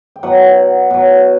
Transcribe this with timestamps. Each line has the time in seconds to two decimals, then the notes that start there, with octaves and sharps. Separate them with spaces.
0.16 G5
0.23 B2 F#3 F#5
0.91 B2 F#3